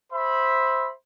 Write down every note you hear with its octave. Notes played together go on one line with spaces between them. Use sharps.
C5 E5 B5